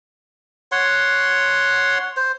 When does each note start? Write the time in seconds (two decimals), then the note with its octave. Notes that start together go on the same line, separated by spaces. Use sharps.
0.72 C#5 F#5 C6
2.17 C5